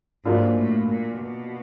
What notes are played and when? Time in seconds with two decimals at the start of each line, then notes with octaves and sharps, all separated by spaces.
0.25 G#2 F#3 A#3 D4 F4
0.57 A2
0.88 A#2
1.21 B2